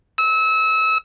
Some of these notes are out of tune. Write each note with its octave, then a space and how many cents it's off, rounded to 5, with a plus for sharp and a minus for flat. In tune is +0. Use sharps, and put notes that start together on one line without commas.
E6 -30